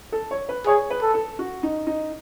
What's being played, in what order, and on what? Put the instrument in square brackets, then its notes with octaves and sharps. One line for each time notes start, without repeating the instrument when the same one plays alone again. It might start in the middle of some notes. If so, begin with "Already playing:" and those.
[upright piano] A4
C#5
B4
[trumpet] G#4 [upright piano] C#5
[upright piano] B4
[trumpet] A4
[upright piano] A4
F#4
D#4
D#4